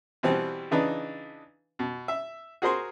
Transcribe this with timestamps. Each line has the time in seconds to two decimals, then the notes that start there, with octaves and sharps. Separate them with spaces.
0.23 B2 E3 G3 C4
0.71 C#3 E3 D4 D#4 B4
1.79 B2
2.08 E5
2.62 F#4 G#4 A#4 C5 C6